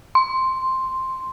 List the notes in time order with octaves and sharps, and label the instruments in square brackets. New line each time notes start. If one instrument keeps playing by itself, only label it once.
[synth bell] C6